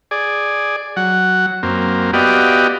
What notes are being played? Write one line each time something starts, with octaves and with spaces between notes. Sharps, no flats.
G#4 D5
F#3 F#5
F#2 A#3 C4
B3 F#4 G4 D5 D#5 F5